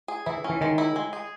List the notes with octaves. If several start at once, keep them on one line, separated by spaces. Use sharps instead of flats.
G#4
E3 E4
E3 C#4
D#3 G#3
E4
G#3
G#4